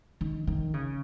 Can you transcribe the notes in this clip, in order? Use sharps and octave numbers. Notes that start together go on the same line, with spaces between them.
D#3
D#3
C#3